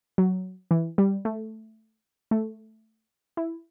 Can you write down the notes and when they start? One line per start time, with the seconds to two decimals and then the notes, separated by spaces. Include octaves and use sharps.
0.18 F#3
0.71 E3
0.98 G3
1.25 A3
2.31 A3
3.37 E4